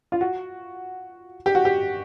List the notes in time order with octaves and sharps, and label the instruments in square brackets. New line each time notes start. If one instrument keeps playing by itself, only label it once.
[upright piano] F4
F#4
G4
F#4
G4